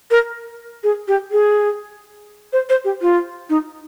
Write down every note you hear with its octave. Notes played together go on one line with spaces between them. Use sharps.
A#4
G#4
G4
G#4
C5
C5
G4
F4
D#4